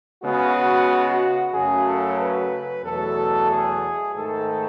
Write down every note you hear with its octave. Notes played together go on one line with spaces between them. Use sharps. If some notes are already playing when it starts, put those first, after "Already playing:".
C#3 G#3 B3 F#4
F#2 C#3 F#3 A3 G#4
A4
B4
E2 B2 F#3 A3 A4
G#4
G#2 D#3 A3 A4